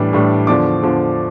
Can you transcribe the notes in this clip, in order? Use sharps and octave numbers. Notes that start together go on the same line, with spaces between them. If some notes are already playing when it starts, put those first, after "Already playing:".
Already playing: A2 E3 G3 D4
A2 E3 G3 D4
E2 D3 F3 D5 D6
E2 D3 F3